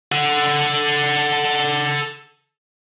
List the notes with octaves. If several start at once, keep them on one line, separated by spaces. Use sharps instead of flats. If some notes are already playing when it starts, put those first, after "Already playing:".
A4 F#5